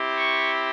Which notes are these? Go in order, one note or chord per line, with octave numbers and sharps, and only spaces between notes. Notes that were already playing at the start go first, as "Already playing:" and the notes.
Already playing: C4 E4 G4
C#6